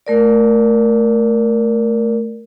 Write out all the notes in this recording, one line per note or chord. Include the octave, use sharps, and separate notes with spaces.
A3 A#4 D5